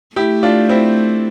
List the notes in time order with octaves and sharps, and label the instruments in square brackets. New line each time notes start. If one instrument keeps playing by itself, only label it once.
[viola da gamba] A3 [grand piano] E4 G4
[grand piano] D4 F4
C4 E4